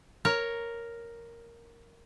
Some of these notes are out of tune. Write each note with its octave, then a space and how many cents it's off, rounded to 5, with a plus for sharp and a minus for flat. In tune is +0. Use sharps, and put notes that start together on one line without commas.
A#4 +0 C#5 +0